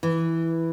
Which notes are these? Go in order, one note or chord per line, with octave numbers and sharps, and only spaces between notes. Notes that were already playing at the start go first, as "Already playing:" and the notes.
E3